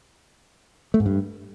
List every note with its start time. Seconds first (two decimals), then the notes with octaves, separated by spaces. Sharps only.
0.94 A3
1.00 G#2
1.06 G2